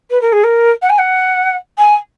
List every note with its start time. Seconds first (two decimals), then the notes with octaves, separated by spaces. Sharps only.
0.10 B4
0.21 A#4
0.32 G#4
0.43 A#4
0.82 F#5
0.89 G#5
0.98 F#5
1.78 G#5